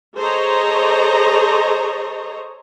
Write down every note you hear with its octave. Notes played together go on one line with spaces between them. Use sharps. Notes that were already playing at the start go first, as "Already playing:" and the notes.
G#4 A4 C5 C#5 D#5 A#5